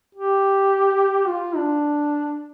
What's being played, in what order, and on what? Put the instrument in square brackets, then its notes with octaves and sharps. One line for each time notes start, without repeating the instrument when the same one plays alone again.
[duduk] G4
F4
D4